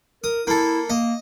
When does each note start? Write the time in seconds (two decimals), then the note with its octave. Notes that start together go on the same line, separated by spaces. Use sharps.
0.24 A#4 D#6
0.47 A#3 E4 A4
0.90 A#3 D#5